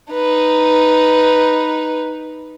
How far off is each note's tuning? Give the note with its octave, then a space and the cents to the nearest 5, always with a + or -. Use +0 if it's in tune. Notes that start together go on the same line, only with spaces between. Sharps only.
D#4 +0 B4 +0